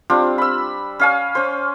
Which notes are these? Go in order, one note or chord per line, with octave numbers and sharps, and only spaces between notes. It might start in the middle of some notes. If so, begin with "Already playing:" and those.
G3 C4 D4 F4
B5 E6
C#4 F5 G#5
C#4 C5